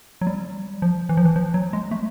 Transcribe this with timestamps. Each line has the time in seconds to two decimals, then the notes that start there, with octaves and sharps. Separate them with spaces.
0.21 F#3
0.27 G3
0.82 F3
1.09 E3
1.17 F3
1.25 E3
1.36 F3
1.54 F#3
1.73 G#3
1.91 A3